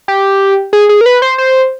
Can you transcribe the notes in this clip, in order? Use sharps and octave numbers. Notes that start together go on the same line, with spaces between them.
G4
G#4
G#4
A#4
B4
C5
C5